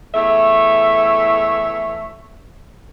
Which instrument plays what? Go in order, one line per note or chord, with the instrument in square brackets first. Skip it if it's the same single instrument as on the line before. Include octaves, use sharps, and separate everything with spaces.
[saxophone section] E2 A3 C#5 E5